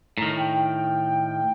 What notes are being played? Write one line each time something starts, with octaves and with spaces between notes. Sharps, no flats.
A2 D#3 A#5
G5